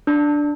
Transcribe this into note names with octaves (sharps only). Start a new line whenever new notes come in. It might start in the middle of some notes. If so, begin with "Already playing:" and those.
D4